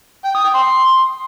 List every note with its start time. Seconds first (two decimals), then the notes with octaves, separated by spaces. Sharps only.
0.25 G5
0.35 D#6
0.45 G5
0.54 C6